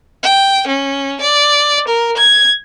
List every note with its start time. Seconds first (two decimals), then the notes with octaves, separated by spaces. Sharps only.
0.23 G5
0.68 C#4
1.21 D5
1.88 A#4
2.17 G#6